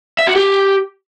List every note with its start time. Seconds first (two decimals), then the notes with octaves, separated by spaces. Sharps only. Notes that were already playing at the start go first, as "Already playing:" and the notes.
0.19 E5
0.27 F#4
0.36 G4